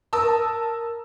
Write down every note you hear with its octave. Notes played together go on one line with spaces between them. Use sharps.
A#4 A5 D#6 E6